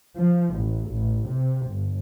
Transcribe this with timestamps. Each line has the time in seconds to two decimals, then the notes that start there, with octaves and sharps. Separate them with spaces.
0.19 F3
0.58 A1
0.91 A1
1.29 C3
1.69 G1